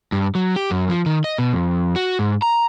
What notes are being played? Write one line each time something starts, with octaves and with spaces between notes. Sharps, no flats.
G2
F#3
G4
F#2
F3
D#3
D#5
B2
F2
F#4
G#2
A#5